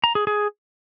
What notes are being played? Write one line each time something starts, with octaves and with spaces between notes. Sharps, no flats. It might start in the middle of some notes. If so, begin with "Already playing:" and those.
A#5
G#4
G#4